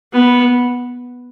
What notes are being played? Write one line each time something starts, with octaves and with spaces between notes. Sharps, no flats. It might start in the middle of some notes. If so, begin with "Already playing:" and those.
B3